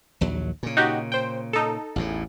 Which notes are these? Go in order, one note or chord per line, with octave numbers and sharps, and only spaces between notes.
A#1 D#2 F#3
A#2 C#3
D#4 F#4 G4
C5 G5
D#4 A4
A1 E2 A2